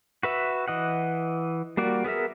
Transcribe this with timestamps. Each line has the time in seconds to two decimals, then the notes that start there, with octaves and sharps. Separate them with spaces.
0.23 F#4 B4 E5
0.68 E3 D#5 F#5
1.77 G3 A#3 F#4 D5
2.04 B3 G#4 A#4 E5